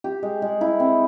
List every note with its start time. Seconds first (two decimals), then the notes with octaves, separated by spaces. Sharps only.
0.04 G4
0.23 G#3
0.42 G#3
0.61 E4
0.80 C4